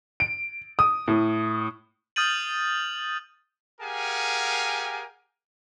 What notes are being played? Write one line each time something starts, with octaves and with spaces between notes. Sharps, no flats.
D7
D#6
A2
D#6 F6 G6 A6 D#7 F#7
G4 G#4 A#4 F5 F#5 G#5